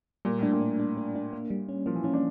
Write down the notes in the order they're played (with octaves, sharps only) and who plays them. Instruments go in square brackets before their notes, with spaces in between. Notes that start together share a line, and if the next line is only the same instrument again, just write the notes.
[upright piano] A#2 [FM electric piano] G3
[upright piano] A2 [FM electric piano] D4
[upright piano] A#2
[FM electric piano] D4
D4
D4
D4
A#3
G3
C#4
[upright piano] F3 [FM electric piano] A#3
[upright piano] E3
[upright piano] F3 [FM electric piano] C#4
[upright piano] D4